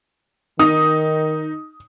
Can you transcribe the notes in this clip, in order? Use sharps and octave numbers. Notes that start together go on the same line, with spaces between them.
D#3 D#4 D#6